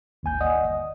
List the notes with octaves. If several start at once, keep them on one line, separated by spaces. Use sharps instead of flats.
G#1 D#2 G#5 G6
D5 D#5 F#5 D#6
G1